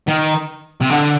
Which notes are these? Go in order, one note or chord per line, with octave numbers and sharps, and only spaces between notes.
D#3
C3
D3